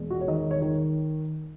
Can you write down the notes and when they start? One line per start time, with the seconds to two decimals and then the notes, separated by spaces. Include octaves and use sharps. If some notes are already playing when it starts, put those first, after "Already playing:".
Already playing: E1
0.11 F#4
0.21 C#5
0.28 D#3 D#5
0.51 C#5
0.62 D#3